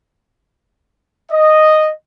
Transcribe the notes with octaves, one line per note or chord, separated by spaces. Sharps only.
D#5